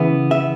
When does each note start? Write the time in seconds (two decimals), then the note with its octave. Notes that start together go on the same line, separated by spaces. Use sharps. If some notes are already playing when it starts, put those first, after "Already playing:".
Already playing: C#3 E3 B3 E5
0.31 E5